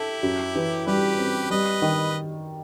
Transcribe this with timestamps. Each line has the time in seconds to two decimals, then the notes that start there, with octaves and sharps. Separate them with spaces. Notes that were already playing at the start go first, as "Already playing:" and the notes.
Already playing: E4 G4 A4
0.23 F#2
0.55 E3
0.87 G3 G4 B4
1.18 C4
1.50 G3 B4 D#5
1.82 D#3